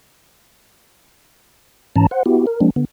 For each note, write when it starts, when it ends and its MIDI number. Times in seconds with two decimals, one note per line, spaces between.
1.96 2.07 44
1.96 2.07 52
1.96 2.07 61
1.96 2.07 81
1.96 2.07 82
2.11 2.23 72
2.11 2.23 78
2.26 2.46 59
2.26 2.46 64
2.26 2.46 66
2.26 2.46 67
2.47 2.60 70
2.61 2.70 53
2.61 2.70 56
2.61 2.70 58
2.61 2.70 60
2.61 2.70 62
2.76 2.85 50
2.76 2.85 59